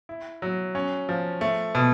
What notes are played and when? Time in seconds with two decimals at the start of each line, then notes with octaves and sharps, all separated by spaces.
0.09 E4
0.42 F#3
0.75 C#4
1.09 F3
1.41 A3
1.75 B2